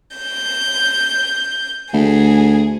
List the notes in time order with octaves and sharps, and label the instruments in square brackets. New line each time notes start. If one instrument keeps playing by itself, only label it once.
[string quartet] G6
[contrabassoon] D2 [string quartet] G#4